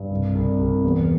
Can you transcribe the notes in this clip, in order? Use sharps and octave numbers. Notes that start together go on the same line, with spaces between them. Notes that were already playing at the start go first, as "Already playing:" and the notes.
Already playing: G2
C2
C2
C2
E2